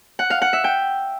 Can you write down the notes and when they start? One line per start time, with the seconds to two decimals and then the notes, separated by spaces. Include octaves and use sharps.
0.19 F#5
0.30 F5
0.42 F#5
0.53 E5
0.64 G5